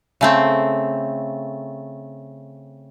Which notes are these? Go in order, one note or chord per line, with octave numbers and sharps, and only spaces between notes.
C#3 A3 C4